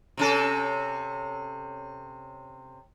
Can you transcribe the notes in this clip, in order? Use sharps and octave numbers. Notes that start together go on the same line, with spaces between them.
C3 C#4 A4